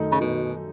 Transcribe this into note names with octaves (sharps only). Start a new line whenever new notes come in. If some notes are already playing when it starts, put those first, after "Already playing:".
Already playing: F#2 D#3 A3 D#4
C#3
B2 D#3